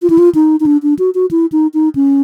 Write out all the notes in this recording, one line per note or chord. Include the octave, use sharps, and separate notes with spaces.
F4
E4
F4
D#4
D#4
D4
D4
F#4
F#4
E4
D#4
D#4
C#4